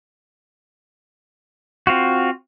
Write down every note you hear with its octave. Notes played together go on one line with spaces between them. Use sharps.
C4 F4 F#4